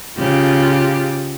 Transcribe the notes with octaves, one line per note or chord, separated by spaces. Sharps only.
C#3 F4 G4